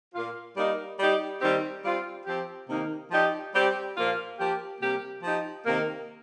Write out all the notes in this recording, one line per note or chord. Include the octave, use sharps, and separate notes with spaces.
A#2 A#3 F4
G3 A#3 D#4
G3 D#4 G4
D#3 G3 C4 D#4 G4
G3 C4 F4
F3 C4 G4
C3 D#3 A#3 D#4
F3 D#4 G4
G3 C4 G4
A#2 F3 A#3 F4
F3 A#3 G4
C3 G3 A#3 G4
F3 D#4 G4
C3 D#3 A#3